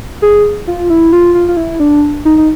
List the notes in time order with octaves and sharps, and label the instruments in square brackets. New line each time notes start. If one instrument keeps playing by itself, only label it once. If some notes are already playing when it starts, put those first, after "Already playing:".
[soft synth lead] G#4
F4
E4
F4
F4
F4
E4
D4
D#4
D#4